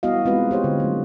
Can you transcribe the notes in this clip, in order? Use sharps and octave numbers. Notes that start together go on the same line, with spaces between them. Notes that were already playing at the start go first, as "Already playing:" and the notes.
G3 B3 E4 F#4 D#5 F5
G#3 C4 F4 F#4 B4
G4 C5 C#5
D3
F#3 A3